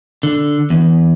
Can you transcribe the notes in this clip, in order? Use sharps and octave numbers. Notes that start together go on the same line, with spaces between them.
D3
E2